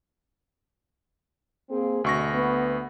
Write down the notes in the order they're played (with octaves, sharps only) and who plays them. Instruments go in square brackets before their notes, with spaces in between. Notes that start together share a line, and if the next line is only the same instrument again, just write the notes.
[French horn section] A#3 C4 G#4
[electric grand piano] D2 C#6 A#6 [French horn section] B2
[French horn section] B3